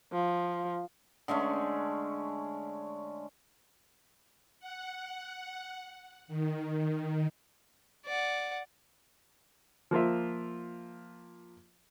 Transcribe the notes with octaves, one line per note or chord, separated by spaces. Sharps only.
F3
D3 G#3 A3 C#4
F#5
D#3
D5 F#5
F3 A#3 F4 E5